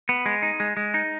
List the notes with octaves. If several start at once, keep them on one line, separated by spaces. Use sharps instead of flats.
B3
G#3
D#4
G#3
G#3
D#4